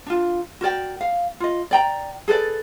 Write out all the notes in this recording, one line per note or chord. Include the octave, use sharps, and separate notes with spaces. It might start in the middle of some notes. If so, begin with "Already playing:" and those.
D4 F4
F#4 A#4 D5 G5
F5
F4 D#5
D5 G5 A#5
G#4 A4 B4 D5